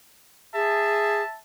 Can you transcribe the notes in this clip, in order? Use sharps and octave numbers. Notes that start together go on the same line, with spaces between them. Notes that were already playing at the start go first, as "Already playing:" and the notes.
G#4 E5 A5